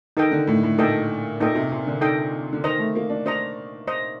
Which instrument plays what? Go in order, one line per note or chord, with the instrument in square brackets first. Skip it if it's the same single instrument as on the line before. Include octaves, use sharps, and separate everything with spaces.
[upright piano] D#3 [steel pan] D#4 A4 D#5 G5
[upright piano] D3
A2
A2
[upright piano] A#2 [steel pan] D#4 A4 D#5 G5
[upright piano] A#2 [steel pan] D#4 A4 D#5 G5
[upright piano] C3
C3
D3
[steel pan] D#4 A4 D#5 G5
[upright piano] D3
[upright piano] D#3 [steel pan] C5 D#5 A#5
[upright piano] A3
A#3
D4
[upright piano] D4 [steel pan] C5 D#5 A#5
[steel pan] C5 D#5 A#5